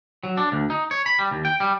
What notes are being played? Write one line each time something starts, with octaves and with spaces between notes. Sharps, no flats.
F#3
D4
D2
D#4
C#5
B5
G3
D#2
G5
G3